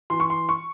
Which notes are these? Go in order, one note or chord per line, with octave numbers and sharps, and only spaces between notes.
E3 C6
C#6
C6
C#6